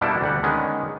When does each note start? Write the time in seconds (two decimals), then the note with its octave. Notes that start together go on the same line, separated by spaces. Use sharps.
0.01 B2 G3 A#3 D4 E4 A4
0.21 D2 G3 F#5
0.43 D3 D#3 G#3 B3 C#4